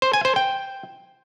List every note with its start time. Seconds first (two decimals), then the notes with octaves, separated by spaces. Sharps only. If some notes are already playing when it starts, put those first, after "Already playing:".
0.02 C5
0.13 G#5
0.25 C5
0.36 G5